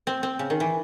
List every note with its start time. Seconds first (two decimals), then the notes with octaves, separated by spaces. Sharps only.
0.07 C4
0.23 C4
0.39 C#3
0.50 D#3
0.60 E3